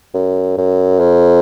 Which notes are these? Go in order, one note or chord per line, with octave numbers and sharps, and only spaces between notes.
F#2
F#2
F2